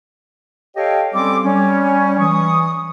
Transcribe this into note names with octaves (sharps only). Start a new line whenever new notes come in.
G4 A4 C#5 D#5 F5 G5
G3 C4 C#4 A4 D6
G3 C#4
E3 C#6 D#6